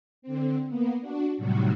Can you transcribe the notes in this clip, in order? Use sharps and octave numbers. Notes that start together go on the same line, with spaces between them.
D3 C4
A#3 B3
D4 F#4
A2 C3 D#3 F#3 G3 F#4